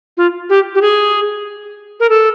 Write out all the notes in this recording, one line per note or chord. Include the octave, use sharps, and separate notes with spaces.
F4
G4
G4
G#4
A#4
A4